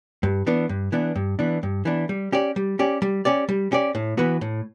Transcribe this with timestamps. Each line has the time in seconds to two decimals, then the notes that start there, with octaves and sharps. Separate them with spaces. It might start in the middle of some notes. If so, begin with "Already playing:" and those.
0.23 G2
0.47 E3 B3 D4
0.69 G2
0.92 E3 B3 D4
1.15 G2
1.39 E3 B3 D4
1.63 G2
1.85 E3 B3 D4
2.09 G3
2.32 C#4 G4 D5
2.56 G3
2.79 C#4 G4 D5
3.02 G3
3.25 C#4 G4 D5
3.49 G3
3.72 C#4 G4 D5
3.95 A2
4.17 E3 B3 F#4 B4
4.41 A2